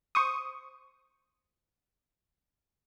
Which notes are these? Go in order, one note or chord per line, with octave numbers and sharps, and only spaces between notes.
C5 C#6 D#6